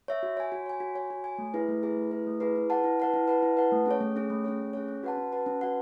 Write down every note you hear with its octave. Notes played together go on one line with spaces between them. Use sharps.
C#5 E5
F#4
C#5 G#5
F#4
C#5 G#5
F#4
C#5 G#5
F#4
C#5 G#5
A3
E4 G#4 B4
A3
E4 G#4 B4
A3
E4 G#4 B4
A3
E4 G#4 B4
E4
B4 F#5 A5
E4
B4 F#5 A5
E4
B4 F#5 A5
E4
B4 F#5 A5
A3
C#4 G#4 C#5
A3
C#4 G#4 C#5
A3
C#4 G#4 C#5
A3
C#4 G#4 C#5
C#4
F#4 B4 F#5 A5
C#4
F#4 B4 F#5 A5
C#4
F#4 B4 F#5 A5